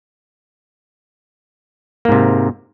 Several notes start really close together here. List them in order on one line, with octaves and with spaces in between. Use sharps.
A#3 G#2 C3